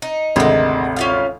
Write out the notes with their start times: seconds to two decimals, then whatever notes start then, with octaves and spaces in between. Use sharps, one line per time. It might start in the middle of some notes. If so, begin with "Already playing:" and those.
0.02 D#4
0.36 G#1 D2 C3 G#3 A#3
0.96 C#4 F4 F5